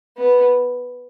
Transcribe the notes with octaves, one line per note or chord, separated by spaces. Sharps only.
B3